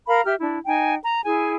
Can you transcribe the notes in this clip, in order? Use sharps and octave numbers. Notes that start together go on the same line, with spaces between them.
A#4 F5 A#5 B5
G4 E5 F6
D4 E4
D#4 G5 G#5
A#5
E4 G#4 G#5